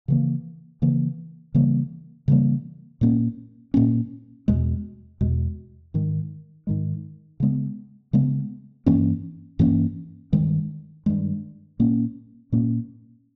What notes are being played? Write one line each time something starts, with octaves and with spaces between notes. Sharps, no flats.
C#3 E3 A#3
C#3 E3 A#3
C#3 E3 G3 A#3
C#3 E3 G3 A#3
A#2 A#3 C#4
A#2 A#3 C#4
E2 B2 G#3
E2 B2 G#3
G#2 D#3 G#3
G#2 D#3 G#3
C#3 G#3 B3
C#3 G#3 B3
G2 E3 A#3 C#4
G2 E3 A#3 C#4
G2 D#3 G#3
G2 D#3 G#3
A#2 A#3 C#4
A#2 A#3 C#4